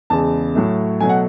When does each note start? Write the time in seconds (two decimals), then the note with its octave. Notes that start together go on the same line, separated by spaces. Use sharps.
0.10 E2 C#3 G#3 A5
0.55 A2 F#3 A3
1.00 B2 F#3 A3 G#5
1.09 F#5